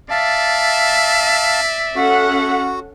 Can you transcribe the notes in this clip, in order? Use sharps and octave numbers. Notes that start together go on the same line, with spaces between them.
D5 E5 F5 A5
C#4 F#4 A4 F#5